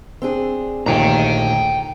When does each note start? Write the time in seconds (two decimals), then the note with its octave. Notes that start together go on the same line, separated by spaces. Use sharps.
0.22 C4 D4 G#4
0.86 A#1 D#2 A#2 D3 D#3 A3 G5 A#5